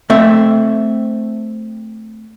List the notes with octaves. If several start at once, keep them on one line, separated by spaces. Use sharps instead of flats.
A3 C4 E5